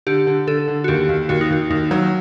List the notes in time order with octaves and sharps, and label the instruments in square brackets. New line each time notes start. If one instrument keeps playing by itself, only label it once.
[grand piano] D3 [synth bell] G4
[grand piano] D3
[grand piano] D3 [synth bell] A4
[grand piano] D3
[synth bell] F#4
[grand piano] D#2 [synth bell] G4
[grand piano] D#2
[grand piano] D#2 [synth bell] F#4
[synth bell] D#4
[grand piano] D#2 [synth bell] F#4
[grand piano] D#2 [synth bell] D#4
[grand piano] F#3